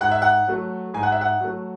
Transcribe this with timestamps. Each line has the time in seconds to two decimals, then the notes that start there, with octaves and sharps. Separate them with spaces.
0.01 G#2 F#5
0.11 E5
0.22 F#5
0.48 F#3 A3
0.94 G#2 G#5
1.03 F#5
1.12 E5
1.21 F#5
1.40 F#3 A3